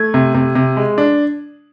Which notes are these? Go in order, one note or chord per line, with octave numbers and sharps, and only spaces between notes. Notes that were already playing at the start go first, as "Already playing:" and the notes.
Already playing: A3 G#6
C3
C3
C3
G#3
D4